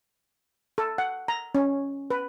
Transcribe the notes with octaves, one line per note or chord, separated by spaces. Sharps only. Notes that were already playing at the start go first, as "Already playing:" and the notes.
A4
F#5
A#5
C#4
B4